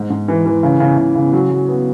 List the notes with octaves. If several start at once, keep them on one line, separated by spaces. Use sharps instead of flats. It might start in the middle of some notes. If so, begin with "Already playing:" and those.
Already playing: G#2
G#2
E3
E3
C#3
C#3
C#3
C#3
F#3
F#3
B3